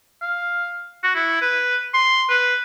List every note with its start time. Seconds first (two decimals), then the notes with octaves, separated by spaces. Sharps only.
0.22 F5
1.03 F#4
1.15 E4
1.41 B4
1.94 C6
2.29 B4